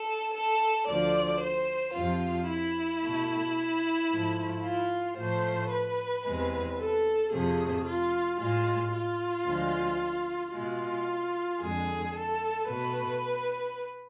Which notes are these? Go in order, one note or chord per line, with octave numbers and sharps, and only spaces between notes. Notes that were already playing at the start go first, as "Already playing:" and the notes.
Already playing: A4
A4
D2 D3 F3 D5
C5
F2 C3 F3 F4
E4
B2 A3
G#2 F3 A3
F4
A2 F3 A3 C5
B4
E2 C3 G#3
A4
F2 C3 F3 A3 G#4
F4
A2 G#3 F4
F4
D2 D3 F3 G#3
B2 G#3 F4
F2 D3 G#3 G#4
A4
B2 A3 B4